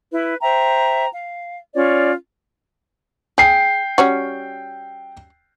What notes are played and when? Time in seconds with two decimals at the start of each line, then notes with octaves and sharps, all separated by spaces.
0.12 E4 B4
0.41 C5 E5 G5 A#5
1.13 F5
1.74 C#4 F4 C#5 D5
3.38 G#4 G5 C7
3.98 G3 C#4 F#4